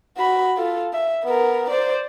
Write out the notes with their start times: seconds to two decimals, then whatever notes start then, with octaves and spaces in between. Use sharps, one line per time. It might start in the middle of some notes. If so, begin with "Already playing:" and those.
0.17 F#4 B5
0.57 F4 A4
0.94 E5
1.24 B3 A#4
1.70 C5 D5